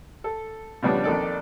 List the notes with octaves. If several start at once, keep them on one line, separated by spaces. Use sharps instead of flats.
A4
C#3 F3 G3 B3 C#4 D4
A#1 F2 D#3 A4 D5